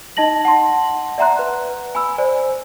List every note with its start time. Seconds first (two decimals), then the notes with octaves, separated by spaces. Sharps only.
0.17 D#4 D#5 A5 A#6 F#7
0.45 F#5 A5 C6
1.18 D5 E5 F#5 A#5 C6 F#6
1.39 B4
1.95 G#5 B5 E6
2.18 C5 D5 G#5